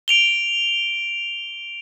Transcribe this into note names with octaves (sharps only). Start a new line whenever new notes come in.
D7 F7 G7